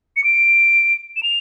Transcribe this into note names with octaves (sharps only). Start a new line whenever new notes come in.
C#7
D7
E7
F7